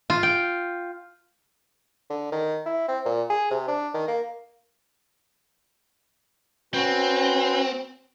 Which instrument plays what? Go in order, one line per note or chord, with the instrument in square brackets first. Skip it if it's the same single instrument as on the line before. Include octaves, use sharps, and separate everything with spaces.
[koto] F4
G5
[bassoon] D3
D#3
E4
C4
A#2
G#4
C3
D4
D#3
A#3
[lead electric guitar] C4 [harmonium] C#4 F#4 B4